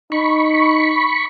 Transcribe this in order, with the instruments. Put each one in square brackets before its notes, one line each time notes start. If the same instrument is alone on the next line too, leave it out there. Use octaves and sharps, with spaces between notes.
[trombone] D#4 [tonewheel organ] B5 C#6